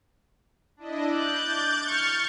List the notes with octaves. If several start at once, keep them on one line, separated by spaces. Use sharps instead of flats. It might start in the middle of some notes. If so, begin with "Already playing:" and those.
D4 E4 D#5
D6 F#6 G6 A6
C#6 F6